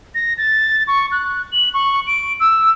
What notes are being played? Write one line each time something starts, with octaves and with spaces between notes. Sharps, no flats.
A#6
A6
C#6
F#6
F#7
C#6
D7
E6